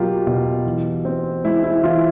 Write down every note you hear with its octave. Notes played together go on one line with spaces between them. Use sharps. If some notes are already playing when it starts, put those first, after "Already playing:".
Already playing: B2 F#3 A#3 F4 G4
B2
E3
C4
G#3 E4
E4
E3 F4